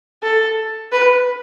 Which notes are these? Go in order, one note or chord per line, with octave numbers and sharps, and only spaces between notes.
A4
B4